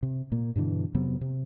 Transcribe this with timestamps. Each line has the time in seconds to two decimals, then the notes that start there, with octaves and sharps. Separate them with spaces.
0.03 C3
0.32 A#2 A#3
0.56 G2 B2 D3 E3
0.94 F2 C3 F#3 B3
1.21 C3